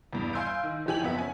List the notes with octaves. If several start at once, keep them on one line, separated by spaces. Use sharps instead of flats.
E2 G2
F5 G#5 C6 E6 G6 D7
D#3
A#1 E3 G4 G#5 F#7
F#1 F2 B3 E5
C#4 G#5